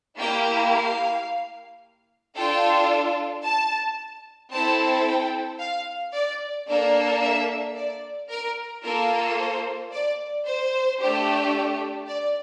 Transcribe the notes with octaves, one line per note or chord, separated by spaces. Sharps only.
A#3 E4 G4 G5
F5
D4 F4 A4 G5
A5
C4 E4 A4 A5
G5
F5
D5
A#3 D4 A4 D5
E5
D5
A#4
A#3 F4 A4 A#4
C5
D5
C5
A3 D4 G4
D5